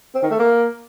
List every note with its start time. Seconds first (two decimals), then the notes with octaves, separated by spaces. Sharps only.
0.15 C4
0.23 D#3
0.31 A3
0.39 A#3